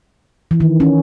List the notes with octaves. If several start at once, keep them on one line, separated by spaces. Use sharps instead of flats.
E3
D#3
C#4